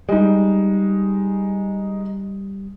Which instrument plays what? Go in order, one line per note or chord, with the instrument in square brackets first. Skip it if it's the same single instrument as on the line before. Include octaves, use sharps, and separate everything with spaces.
[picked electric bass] G3 [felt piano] G#3 D#4